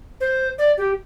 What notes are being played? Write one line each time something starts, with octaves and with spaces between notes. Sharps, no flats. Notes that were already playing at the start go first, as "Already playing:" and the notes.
C5
D5
G4